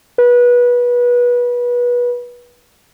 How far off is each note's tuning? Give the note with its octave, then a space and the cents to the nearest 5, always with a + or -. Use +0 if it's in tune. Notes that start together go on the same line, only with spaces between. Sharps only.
B4 -25